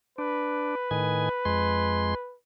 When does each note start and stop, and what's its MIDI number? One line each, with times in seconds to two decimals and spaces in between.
0.18 0.75 62
0.18 2.37 71
0.91 1.29 45
0.91 1.29 51
0.91 1.29 80
1.45 2.14 41
1.45 2.14 56
1.45 2.14 84